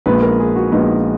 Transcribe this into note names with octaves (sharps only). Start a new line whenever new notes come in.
A#1 A#2 G#3 B3 B4
A#4
G#4
F#4
A#1 A#2 G#3 B3 D#4